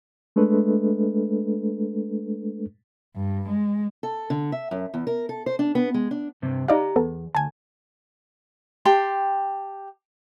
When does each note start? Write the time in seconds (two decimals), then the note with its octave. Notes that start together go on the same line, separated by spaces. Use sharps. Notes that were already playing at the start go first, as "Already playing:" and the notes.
0.36 G#3 A3 D4 A4 B4
3.16 G2
3.49 G#3
4.03 A4
4.30 D3
4.52 E5
4.71 F#2
4.94 E2
5.07 A#4
5.29 A4
5.46 C5
5.59 D4
5.75 B3
5.94 G#3
6.11 D4
6.42 G2 C3 C4
6.68 D#4 G4 D5 F5 A#5
6.96 E2 B3 A4
7.35 D2 G#5 A5
8.85 G4 G5 A5 C6